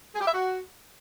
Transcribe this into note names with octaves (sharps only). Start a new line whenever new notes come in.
G#4
G4
E5
F#4